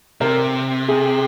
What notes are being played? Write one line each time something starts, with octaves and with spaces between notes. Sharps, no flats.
C3 A#4
G#4